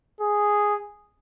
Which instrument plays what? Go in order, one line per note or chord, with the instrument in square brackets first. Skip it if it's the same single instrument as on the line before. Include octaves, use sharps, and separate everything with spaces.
[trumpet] G#4